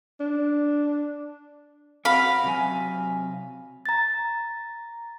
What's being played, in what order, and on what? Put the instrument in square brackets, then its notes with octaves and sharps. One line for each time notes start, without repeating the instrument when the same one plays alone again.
[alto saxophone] D4
[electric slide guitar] C4 F#4 [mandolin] F5 B5
[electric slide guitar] C3 F#3 G#5
[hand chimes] A#5 A6